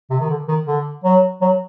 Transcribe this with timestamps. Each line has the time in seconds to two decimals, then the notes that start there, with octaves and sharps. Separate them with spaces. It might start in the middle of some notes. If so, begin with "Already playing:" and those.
0.10 C3
0.20 D#3
0.30 D3
0.48 D#3
0.67 D3
1.04 F#3
1.42 F#3